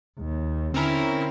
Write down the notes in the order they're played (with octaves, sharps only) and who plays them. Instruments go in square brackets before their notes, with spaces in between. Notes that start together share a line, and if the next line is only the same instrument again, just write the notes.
[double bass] D#2
[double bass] D3 [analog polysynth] C4 C#4 A#4 [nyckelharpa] E4